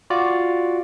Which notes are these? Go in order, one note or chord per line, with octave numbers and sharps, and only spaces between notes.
F4 F#4 D5